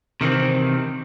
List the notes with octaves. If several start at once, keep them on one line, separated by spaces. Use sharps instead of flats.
C3 D#3 E3 C4